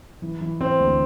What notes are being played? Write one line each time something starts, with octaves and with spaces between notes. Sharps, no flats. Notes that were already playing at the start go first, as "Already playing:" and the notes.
E3
E3
E3 C4
D2